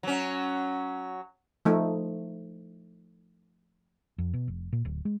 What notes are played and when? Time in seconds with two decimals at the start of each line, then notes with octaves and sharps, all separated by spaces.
0.03 F#3 C#4
1.65 F3 A3 D#4
4.18 F2
4.33 B2
4.48 F1
4.72 A#2
4.85 D1
5.05 G#3